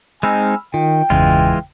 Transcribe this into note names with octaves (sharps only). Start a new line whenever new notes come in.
G#3 C4 D#4 G#5 B5 E6 F6
D#3 F4 G5
G1 E2 C#3 E3 G#3 F4